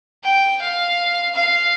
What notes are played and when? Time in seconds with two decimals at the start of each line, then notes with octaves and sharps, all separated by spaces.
0.24 G5
0.61 F5
1.35 F5